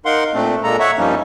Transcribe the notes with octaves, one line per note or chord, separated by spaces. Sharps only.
D#4 A#4 F5 F#5 C6
A#2 A3 C4 D4
A#2 G#3 A#3 A4 A#5
C#5 E5 F#5 C#6
G2 F3 G3 A#3 C#4 D#4